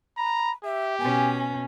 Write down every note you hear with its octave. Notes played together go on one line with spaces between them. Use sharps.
A#5 B5
G4 E5
B2 C#4 G#5